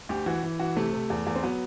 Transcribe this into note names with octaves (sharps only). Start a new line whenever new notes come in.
D2 G4
E3 F#4
E3
E3 F#4
C3 A3
C3
E2
E2
C4
F#3 B3